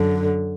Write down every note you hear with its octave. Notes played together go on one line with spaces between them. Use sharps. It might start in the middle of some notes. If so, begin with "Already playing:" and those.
Already playing: F#2 D3